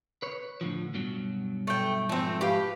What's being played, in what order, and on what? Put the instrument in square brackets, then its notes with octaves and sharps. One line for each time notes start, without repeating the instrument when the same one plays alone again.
[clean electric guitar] B4 C#5
A2 D3 F3
G2 B2 F#3
[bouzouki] A3 G5
[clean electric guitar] G#2 F3 [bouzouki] A3 C4
[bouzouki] G4 B4 F5